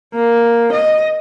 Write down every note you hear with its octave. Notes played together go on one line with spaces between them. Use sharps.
A#3
D#5